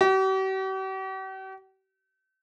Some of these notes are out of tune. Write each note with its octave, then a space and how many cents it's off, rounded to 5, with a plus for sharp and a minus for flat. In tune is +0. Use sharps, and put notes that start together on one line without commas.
G4 -45